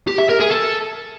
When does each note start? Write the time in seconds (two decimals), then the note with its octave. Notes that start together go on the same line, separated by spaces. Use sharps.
0.07 G4
0.18 E5
0.29 A#4
0.40 G#4
0.51 A4